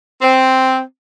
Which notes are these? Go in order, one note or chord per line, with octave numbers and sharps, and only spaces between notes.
C4